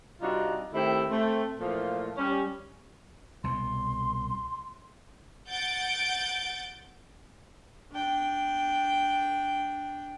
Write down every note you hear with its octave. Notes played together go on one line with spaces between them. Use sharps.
C3 G3 D4 D#4 F4 F#4
D#3 A3 C4 E4 G4
A3 C4
A#2 E3 F3 A3 F4
G3 C#4
C2 B2 C6
F#5 G6 A6 D7
D4 G5